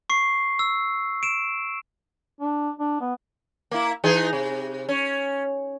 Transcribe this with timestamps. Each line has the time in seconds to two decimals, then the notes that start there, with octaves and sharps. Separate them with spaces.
0.10 C#6 C7
0.59 E6
1.23 D7 E7
2.40 D4
2.79 D4
3.01 B3
3.71 A#3 E4
4.04 E3 D#4 G#4
4.33 C3
4.89 C#4